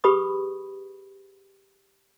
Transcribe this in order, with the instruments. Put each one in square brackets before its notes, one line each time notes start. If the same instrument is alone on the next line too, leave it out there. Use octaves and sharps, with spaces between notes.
[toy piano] G4 G#4 B4 B5 C#6 D#6